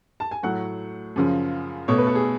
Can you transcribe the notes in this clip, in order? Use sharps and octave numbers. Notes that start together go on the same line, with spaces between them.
A5
G#5
A2 F#3 A3 F#5
F#2 C#3 F3
B2 A3 C#5
B4
A4
G#4